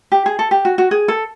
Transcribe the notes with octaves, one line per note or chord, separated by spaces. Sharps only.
G4
G#4
A4
G4
F#4
F#4
G#4
A4